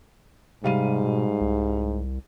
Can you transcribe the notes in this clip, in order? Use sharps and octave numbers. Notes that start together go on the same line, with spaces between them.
G#2 C3 G3 F5 D#7
B2
C2